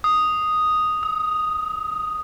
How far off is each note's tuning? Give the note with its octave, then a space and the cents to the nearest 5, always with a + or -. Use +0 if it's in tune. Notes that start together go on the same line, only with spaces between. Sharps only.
D#6 +0
D#6 +35